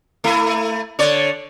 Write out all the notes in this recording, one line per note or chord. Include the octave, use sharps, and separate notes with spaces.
A3 E4
D3 C#5 D5